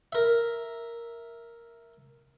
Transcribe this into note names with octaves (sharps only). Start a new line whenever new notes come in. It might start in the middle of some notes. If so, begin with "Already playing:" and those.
A#4 E5